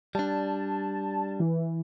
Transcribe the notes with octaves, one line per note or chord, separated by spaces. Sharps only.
G3 D4 A5
E3